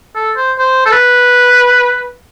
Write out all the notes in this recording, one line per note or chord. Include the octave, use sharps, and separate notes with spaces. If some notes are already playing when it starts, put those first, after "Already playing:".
A4
C5
C5
A4
B4